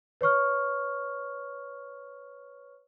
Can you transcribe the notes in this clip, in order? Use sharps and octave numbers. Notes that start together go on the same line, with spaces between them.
B4 C#5 C#6 F6